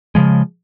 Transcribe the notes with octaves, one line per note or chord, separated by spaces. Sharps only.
C#3 F3 G#3